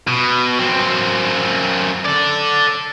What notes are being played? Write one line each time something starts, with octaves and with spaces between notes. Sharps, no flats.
B2
F#2 C4
A4 D5